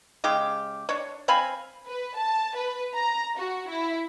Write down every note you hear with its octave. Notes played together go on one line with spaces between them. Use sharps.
C#3 G#3 G4
D4 C#5
C4 F5 G#5 B5
B4
A5
B4
A#5
F#4
E4